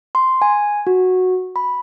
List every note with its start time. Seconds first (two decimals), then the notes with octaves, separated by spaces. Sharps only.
0.15 C6
0.42 G#5
0.87 F#4
1.56 B5